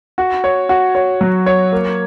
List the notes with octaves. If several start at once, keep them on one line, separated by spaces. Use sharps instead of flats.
F#4
C#5
F#4
C#5
F#3
C#5
A#3